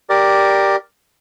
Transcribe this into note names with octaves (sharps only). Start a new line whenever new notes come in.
G4 A#4 D5